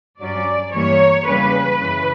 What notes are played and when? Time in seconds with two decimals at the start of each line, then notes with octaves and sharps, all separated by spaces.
0.20 G2 F#3 C#4 D5
0.73 G2 E3 G3 A#3 C#5
1.27 E2 C#3 G3 A#3 C#4 B4
1.80 F#2 C#3 E3